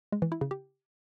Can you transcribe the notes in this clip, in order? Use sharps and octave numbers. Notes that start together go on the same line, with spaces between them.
G#3
E3
E4
C#3
G4